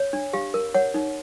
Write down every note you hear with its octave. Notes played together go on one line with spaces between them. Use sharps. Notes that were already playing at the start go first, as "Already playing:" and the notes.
Already playing: C#5
D4
G4 F5
A#4
C#5 F#5
D#4